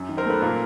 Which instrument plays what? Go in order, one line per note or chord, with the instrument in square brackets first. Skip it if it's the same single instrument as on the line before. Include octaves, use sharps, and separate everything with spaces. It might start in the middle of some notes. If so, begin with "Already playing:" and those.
Already playing: [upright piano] F#2
D#3
A#4 C5
A3 A4 B4
A#2 A#4